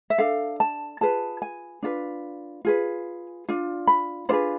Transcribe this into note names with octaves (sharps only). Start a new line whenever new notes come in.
E5
D4 A4 F5
A5
F4 G#4 B4 A5
G#5
D4 F4 G#4 B4
F4 G#4 B4
D4 F4
B5
D4 F4 G#4 B4 C5